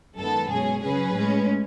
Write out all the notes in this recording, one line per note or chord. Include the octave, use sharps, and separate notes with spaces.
F#2 D#3 G#3 B3 A4
B2 G#3 C#4 G#4
C#3 F#3 C#4 G#4 B4
A2 G#3 C#4